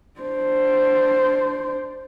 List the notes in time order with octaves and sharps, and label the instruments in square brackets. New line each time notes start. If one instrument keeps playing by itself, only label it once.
[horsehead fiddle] D4 C5